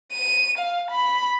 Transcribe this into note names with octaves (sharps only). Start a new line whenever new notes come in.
D#7
F5
B5